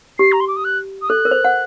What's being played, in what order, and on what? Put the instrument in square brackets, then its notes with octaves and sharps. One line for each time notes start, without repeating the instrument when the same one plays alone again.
[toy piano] G4 [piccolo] C7
[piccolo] A#5
C6
D6
D#6
F#6
D#6
[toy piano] A4 [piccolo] F#6
[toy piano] A#4
C5
F#5